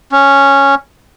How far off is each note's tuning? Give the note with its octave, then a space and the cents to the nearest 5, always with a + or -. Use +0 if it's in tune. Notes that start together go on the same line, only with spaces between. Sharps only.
C#4 -5